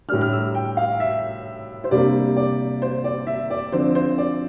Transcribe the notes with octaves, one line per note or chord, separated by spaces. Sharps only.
A2 G3 D4 F6
F6
E6
G5
F5
E5
C5
C3 G3 A#3 D4 D5
D5
C5
D5
E5
D5
D3 F3 C4 C5
C5
D5